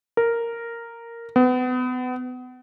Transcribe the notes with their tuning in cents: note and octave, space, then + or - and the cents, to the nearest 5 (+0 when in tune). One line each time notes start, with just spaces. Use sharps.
A#4 -5
B3 +30